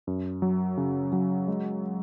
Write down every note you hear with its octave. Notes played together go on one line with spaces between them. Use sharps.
F#2
F#3
C#3
F#3
G#3